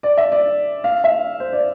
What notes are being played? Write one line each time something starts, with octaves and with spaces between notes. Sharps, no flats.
D5
E5
D5
F5
E5
C5
D5